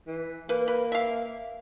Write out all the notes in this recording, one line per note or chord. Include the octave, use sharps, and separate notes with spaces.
E3
A#3 B4
B4
E5 F5